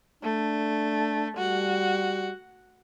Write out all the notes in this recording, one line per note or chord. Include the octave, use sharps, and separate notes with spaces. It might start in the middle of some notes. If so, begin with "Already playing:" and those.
A3 D4
G3 F#4